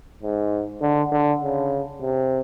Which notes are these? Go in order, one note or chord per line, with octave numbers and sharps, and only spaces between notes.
G#2
D3
D3
C#3
C3